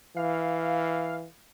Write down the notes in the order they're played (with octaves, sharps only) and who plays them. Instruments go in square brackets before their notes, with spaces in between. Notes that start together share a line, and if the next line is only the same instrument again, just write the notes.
[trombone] E3 [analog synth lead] F5